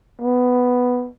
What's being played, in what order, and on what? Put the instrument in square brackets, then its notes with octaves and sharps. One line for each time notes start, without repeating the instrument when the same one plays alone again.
[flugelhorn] B3